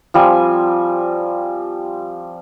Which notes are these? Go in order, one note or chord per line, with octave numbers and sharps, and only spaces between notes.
F3 G3 C4 G#5